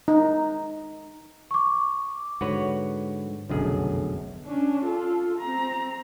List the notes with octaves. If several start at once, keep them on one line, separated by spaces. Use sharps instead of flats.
D#4
C#6 D6
G#2 D3 F#4 B4 C#5
F1 B1 F#2 D3 G#4
C#4 D4
F4 A4
C4 A#5